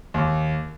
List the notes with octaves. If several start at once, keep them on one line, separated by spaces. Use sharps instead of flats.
D#2